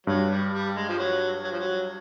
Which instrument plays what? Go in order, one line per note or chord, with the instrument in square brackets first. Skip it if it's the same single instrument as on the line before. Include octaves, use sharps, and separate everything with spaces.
[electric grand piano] G2 [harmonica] F#3
[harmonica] G3
G3
G#3
F3
F#3
F#3
F3
F#3